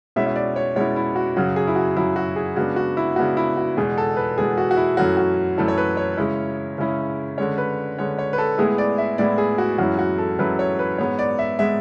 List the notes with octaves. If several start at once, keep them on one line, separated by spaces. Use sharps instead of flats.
B2 G#3 C#4 E4 E5
E5
D5
C#5
B2 G#3 C#4 E4 C#5
E4
F#4
F#2 C#3 F#3 F#4
G#4
E4
F#4
F#2 C#3 F#3 E4
F#4
G#4
C#3 G#3 B3 D4 F#4
F#4
E4
C#3 G#3 B3 D4 F#4
E4
F#4
E2 B2 G#3 G#4
A4
B4
E2 B2 G#3 G#4
F#4
F#4
E4
F#2 E3 A3 C#4 E4 F#4
F#4
F#2 E3 A3 C#4 E4 A4
C#5
B4
C#5
C#3 G#3 C#4 E4
C#3 G#3 C#4 E4
D3 G#3 C#4 C#5
B4
D3 G#3 C#4 C#5
C#5
B4
A4
A2 G#3 B3 E4 G#4
D5
E5
A2 G#3 B3 E4 D5
G#4
F#4
F#2 E3 G#3 C#4 E4 F#4
F#4
A4
F#2 E3 G#3 C#4 E4 B4
C#5
B4
G#2 G#3 B3 C#5
D5
E5
G#3 B3 E5